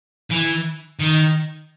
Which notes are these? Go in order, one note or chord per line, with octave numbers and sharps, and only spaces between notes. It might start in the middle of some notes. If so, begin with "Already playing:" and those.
E3
D#3